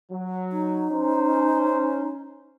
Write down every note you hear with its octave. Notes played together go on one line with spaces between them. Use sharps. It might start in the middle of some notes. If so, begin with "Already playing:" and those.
F#3
D#4
C#4 C5